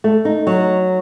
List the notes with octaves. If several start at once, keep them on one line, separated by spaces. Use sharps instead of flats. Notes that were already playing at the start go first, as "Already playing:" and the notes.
A3
D#4
F#3